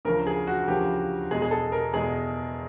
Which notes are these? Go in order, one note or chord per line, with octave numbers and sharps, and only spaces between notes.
D2 C#3 F3 A#3 A#4
G#4
F#4
D2 C#3 F3 A#3 G4
E2 B2 G#3 G#4
G#4
A4
A#4
E2 B2 G#3 G#4